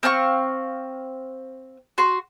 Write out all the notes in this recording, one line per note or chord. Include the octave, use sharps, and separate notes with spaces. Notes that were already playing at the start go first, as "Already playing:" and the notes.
C4 F5 G#5 C#6
F#4 C6